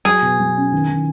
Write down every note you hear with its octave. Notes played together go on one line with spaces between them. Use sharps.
F#3 G#4
B2
F#3
C#4
D#3
D#3